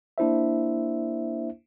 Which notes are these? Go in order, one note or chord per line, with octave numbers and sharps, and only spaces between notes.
A#3 D4 E4 C5 E5